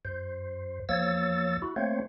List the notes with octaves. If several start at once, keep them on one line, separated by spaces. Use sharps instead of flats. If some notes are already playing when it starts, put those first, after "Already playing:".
F#2 C5
E2 F3 A#3 C#5 E6 A6
E4 F#4
A3 A#3 C4 C5 C#5